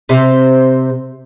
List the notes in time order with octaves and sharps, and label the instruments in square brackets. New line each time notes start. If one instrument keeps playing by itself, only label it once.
[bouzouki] C3 C5